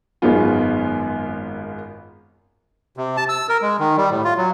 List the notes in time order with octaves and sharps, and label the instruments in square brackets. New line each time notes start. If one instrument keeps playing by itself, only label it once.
[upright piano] G#1 F#2 D#3 G#3 B3 F4
[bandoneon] C3
A5
E6
A#4
G#3
D#3
G3
A2
F4
F#3